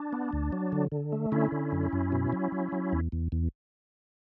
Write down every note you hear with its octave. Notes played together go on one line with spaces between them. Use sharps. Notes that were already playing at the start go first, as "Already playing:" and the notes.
Already playing: D4
B3
D2
F#3
D3
D3
A3
D3 C#4 E4
D3
F#2
F#2
B2
F#3
F#3
F#3
E2
E2
E2